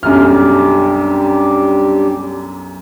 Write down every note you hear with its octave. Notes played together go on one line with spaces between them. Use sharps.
B1 F#2 G3 D4 G4 F6